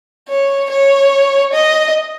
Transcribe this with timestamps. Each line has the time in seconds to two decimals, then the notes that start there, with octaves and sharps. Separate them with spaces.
0.29 C#5
0.70 C#5
1.53 D#5